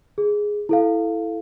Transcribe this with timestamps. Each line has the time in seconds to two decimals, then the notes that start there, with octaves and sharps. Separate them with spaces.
0.18 G#4
0.69 E4 A4 F5